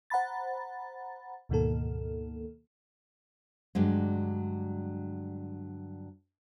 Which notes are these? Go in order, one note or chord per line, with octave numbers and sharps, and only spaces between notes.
C5 F#5 A#5 B5 A6
D2 G#2 B2 D#3 A#3 A4
G2 D3 F#3 G#3